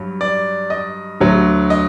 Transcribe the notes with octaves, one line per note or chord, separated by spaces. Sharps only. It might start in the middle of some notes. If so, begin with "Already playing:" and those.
Already playing: G2 F#3
D5
D#5
D2 D3 F#3
D#5